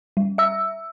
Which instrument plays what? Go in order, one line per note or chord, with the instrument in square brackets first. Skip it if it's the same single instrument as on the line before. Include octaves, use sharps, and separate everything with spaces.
[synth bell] G3
E5 E6